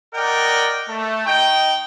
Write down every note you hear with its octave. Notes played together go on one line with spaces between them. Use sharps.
A#4 D5 D#5 F#5 G5
A3
D#4 D#5 G5